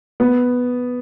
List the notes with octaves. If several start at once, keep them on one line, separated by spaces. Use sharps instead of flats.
B3